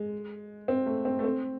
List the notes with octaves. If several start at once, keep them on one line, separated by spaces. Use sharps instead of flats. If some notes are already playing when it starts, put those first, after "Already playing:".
Already playing: G#3
C4
A3
C4
A3
C4